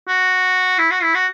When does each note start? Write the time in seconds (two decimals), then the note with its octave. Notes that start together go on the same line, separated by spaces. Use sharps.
0.08 F#4
0.79 E4
0.91 F#4
1.03 E4
1.15 F#4